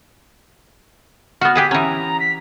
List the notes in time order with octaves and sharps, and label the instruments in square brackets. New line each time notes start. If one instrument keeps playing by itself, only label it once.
[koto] B3 F#4 [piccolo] F6
[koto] G4 G#4 B4 [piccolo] B6
[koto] E3 C#4 [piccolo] A#5
[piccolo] B6